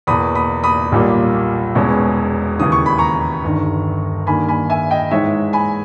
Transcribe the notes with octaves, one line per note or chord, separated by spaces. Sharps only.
E2 B2 A#3 B5 D#6
B5 D#6
B5 D#6
B1 A#2 G3 A#3
E1 E2 B2 G#3 C#4
D#2 C#3 E3 D#6
C#6
B5
A#5 C#6
G1 G2 D#3
G2 D#3 A#3 G#5 B5
G#5 B5
E5 G#5
D#5 G5
G#2 E3 G#3 D#4 C#5 E5
G#5 B5